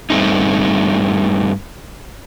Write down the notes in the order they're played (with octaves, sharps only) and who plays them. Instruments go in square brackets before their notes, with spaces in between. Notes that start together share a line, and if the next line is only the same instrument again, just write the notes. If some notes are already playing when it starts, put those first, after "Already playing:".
[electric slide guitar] G2 A#2 A3 C4 D#4